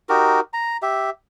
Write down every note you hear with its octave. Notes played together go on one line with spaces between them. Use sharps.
D#4 F#4 G4 A#4
A#5
G4 E5